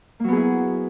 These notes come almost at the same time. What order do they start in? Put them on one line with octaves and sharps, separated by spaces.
A#3 F#3 B3 G#4 E4